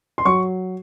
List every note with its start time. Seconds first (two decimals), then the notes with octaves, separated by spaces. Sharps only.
0.18 C6
0.25 F#3 C#6